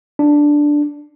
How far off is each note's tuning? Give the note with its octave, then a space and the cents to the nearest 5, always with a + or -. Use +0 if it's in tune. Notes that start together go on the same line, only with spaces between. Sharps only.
D4 +0